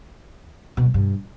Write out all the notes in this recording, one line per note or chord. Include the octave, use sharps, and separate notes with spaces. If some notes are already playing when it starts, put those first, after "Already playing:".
B2
F#3
G2